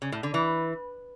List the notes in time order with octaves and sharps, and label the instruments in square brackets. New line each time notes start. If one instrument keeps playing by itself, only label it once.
[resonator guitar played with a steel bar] C#3
A2
D3
E3